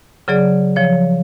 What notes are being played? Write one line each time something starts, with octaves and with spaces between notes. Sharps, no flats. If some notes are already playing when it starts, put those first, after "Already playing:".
C#3 F#3 G#4 D5
F3 C#5